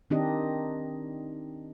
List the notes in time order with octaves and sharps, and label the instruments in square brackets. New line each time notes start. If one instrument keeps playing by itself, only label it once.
[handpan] D#3 C4 D4 D#4 G4 D#5